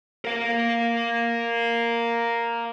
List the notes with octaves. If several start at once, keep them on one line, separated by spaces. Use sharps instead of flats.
A#4 F5